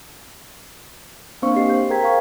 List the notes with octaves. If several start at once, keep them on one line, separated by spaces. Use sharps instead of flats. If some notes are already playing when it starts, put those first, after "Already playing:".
A#3 C4 D4 C5 F5 C#6
G4 D#5 C7
C5 G6
G#4 A#4 G5 A#5 G#6 B6
F5 C#6